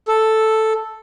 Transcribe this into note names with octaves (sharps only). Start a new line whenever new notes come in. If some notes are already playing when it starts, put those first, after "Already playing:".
A4